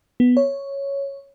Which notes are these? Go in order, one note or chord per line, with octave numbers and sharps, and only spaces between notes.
B3
C#5